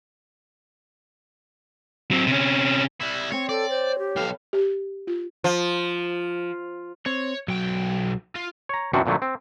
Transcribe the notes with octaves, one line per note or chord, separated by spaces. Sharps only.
F#3 C4
C3 C#4
G3 E4
C4 C#5 G5
A4 C#5 D5
C5
G4
B1 A4 B4 F5 G5
G4
F4
F3
C4 C#5
B1 F#3 G5
F4
C#5 A#5
F#2 C3 E3 C4 D4 F#4
F2 A#2 D3 F#3 A3
C4